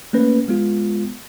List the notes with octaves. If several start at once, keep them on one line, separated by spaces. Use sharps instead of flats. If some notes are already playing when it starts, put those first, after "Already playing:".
A3 A#3 C#4 B4
G#3 B3 F4